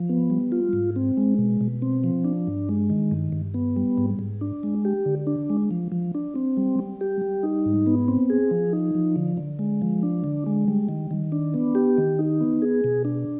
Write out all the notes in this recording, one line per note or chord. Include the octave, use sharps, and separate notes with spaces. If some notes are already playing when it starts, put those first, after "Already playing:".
Already playing: F3
B3
G3
F4
G#2
C4
G#3
B2
B2
C4
F3
D4
G2
G#3
D#3
G2
G2
B3
G3
G#2
G#2
D4
G#3
G4
D3
D4
G#3
F3
F3
D4
C4
G3
G3
G4
G3
D#4
G#2
B3
C4
G#4
F3
D#4
F3
D3
D3
G#3
F3
D4
D3
G#3
G3
D#3
D#3
D4
B3
G4
D#3
D#4
B3
G#4
B2
D4